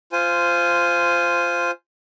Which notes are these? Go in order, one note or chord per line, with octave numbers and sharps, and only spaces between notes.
F4 C5 G#5